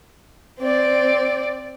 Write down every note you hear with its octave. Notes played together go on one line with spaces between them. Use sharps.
C4 D5